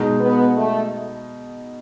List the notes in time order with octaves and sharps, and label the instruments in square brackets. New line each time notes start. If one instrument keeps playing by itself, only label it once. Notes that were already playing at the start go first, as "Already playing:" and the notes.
Already playing: [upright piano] B2 G#3 D#4
[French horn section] B3
A3